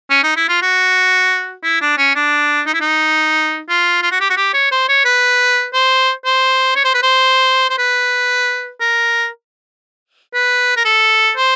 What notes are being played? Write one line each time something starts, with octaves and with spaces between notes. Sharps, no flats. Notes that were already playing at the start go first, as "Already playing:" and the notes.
C#4
D#4
E4
F4
F#4
E4
D4
C#4
D4
D#4
E4
D#4
F4
F4
F#4
G4
F#4
G4
C#5
C5
C#5
B4
C5
C5
C#5
C5
B4
C5
C5
B4
A#4
B4
A#4
A4
C5